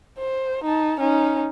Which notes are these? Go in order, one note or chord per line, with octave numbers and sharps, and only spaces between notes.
C5
D#4 A5
C#4 D#4